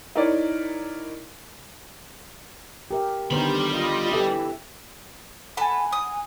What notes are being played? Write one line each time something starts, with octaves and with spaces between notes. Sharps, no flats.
D#4 E4 A#4 C#5 D5
G4 A#4 E5
D3 D#3 G3 B3 G4 C5 B5
F4 D#5
E3 G4 A4 E5
A4 F#5 G#5 A5 B5
D#6